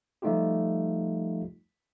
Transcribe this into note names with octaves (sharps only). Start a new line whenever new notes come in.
F3 G3 A3 D#4 F4 G4